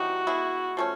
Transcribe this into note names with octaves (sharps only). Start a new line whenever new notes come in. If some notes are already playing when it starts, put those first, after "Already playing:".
Already playing: E3 G3 C4 D#4 F#4
G#3 B3 E4
F3 A3 C#4